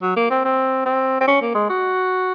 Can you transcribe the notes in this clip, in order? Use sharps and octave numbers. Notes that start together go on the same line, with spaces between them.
F#3
A#3
C4
C4
C4
C4
C#4
A#3
G#3
F#4